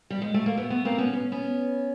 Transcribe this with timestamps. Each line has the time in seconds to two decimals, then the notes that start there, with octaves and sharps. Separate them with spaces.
0.10 G3
0.22 G#3
0.34 A3
0.46 A#3
0.57 A3 B3
0.70 A3 B3
0.85 A#3 C4
0.98 B3 C#4
1.13 C#4
1.32 B3 C#4